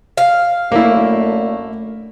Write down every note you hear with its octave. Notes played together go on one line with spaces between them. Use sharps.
F5
F#2 D3 A3 A#3 E4